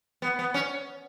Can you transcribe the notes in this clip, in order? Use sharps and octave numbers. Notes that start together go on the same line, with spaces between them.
B3
B3
C#4